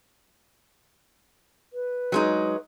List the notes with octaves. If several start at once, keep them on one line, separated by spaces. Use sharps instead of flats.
B4
F#3 G#3 D#4